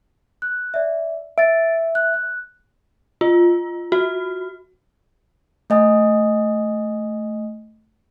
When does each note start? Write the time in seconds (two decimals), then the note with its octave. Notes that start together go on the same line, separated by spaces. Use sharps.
0.42 F#6
0.74 D5 E5
1.38 E5 A6 D7
1.95 F#6
3.21 F4
3.92 F#4
5.70 A3 D#5 G#5 D#6